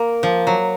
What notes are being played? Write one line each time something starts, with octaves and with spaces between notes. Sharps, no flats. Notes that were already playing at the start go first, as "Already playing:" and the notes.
Already playing: A#3
F3
F#3